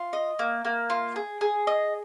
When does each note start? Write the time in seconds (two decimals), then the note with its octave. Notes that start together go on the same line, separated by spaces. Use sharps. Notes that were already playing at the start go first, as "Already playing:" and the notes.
Already playing: F4
0.13 D#5
0.39 A#3
0.65 A#3
0.90 F4
1.16 G#4
1.41 G#4
1.67 D#5